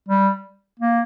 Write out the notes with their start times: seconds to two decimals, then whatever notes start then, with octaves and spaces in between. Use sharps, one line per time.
0.09 G3
0.79 A#3